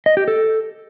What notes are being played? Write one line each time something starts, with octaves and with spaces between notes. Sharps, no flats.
D#5
G4
A4